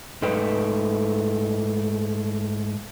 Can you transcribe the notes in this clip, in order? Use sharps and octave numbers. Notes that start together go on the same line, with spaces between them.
G#2 A3 D#4 B4 G5